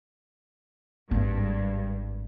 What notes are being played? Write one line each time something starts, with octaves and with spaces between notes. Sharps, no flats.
G#1 G2